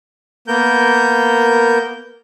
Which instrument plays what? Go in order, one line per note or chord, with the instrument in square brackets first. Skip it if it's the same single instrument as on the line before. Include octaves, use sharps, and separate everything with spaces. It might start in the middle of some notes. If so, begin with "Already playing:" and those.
[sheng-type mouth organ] A#3 B3 A#4 G6